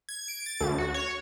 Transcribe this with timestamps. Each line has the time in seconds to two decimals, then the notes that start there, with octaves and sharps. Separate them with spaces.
0.09 G#6
0.28 D7
0.46 A6
0.61 D2
0.78 F#4
0.94 C#5